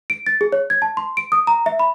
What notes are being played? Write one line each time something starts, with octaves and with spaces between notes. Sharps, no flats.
D7
A6
G#4
C#5
G#6
A5
C6
D7
D#6
A#5
E5
B5